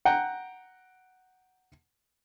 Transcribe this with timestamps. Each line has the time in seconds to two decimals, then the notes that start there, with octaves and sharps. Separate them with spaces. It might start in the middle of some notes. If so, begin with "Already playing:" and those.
0.05 F#5 G5 A#5